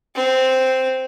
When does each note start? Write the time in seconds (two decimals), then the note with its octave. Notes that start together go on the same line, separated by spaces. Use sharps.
0.15 C4